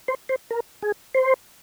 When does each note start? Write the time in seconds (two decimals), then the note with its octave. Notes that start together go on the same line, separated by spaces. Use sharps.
0.08 C5
0.29 C5
0.51 A#4
0.82 G#4
1.15 C5